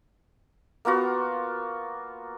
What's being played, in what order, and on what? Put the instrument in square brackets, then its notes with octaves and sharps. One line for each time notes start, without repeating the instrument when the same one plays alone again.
[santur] A#3 B3 F4 F#4